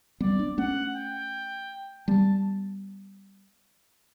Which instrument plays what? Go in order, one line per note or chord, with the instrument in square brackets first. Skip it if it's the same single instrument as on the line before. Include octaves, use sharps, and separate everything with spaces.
[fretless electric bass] G3 B3 [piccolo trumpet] D5
[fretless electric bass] B3 D4
[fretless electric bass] A3 C#4 [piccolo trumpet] F#5
[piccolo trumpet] G5
[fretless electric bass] G3 B3 [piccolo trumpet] A5